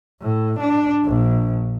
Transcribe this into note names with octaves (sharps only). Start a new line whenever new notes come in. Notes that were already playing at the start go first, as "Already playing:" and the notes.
A2
D4
A#1